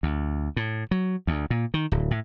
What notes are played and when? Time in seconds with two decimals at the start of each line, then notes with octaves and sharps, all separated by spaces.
0.03 D2
0.56 A2
0.91 F#3
1.27 D2
1.50 A#2
1.74 D#3
1.92 D1
2.11 A2